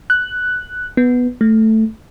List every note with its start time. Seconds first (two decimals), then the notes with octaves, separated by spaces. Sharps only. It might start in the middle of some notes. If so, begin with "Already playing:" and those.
0.10 F#6
0.97 B3
1.41 A3